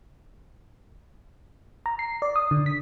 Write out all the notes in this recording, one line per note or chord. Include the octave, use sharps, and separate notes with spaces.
A#5
C7
D5
D#6
D3
B6